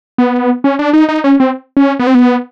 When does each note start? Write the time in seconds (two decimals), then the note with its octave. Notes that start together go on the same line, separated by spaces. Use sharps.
0.18 B3
0.64 C#4
0.79 D4
0.93 D#4
1.09 D#4
1.24 C#4
1.40 C4
1.77 C#4
1.99 B3
2.07 C4
2.15 B3